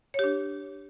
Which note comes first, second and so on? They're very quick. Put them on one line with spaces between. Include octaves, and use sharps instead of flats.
C#5 G4 D4